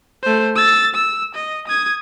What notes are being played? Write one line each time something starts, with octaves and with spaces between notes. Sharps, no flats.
A3 C5
E6 A6
E6
D#5
D#6 G#6